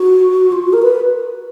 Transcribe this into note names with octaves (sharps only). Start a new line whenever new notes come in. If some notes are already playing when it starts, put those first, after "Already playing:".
Already playing: F#4
F4
F#4
A#4
B4